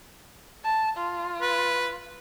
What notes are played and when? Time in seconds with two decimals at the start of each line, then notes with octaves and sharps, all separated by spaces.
0.64 A5
0.97 F4
1.41 B4